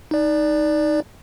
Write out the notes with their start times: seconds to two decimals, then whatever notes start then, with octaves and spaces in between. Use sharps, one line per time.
0.11 D#4 D5